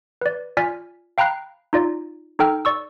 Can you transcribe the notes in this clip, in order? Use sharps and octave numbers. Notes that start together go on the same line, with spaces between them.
B4 D5
F4 D5 G#5 F6 B6
F5 G5 A#5 B5 F#6 C7
D#4 F4 D5
D#4 A4 G5 F6
D5 C#6 E6